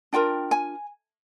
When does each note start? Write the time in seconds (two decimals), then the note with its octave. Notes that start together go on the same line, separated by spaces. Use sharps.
0.13 D4 F4 A#4 G5
0.51 G#5